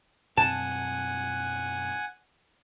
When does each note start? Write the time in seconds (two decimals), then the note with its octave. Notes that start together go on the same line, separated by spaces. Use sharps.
0.37 F#2 B2 C4 F#5 G#5 A5